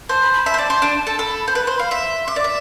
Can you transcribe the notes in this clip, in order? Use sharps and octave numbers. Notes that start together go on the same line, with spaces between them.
C5 A5
B5
B5
E5 A5
C5
D5
C5
D4
A4
A4 B5
C5
B4
C5
F5
E5 C6
E5 D6
D5
E5